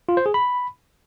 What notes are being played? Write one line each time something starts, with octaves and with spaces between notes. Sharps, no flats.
F4
C5
G#4
B5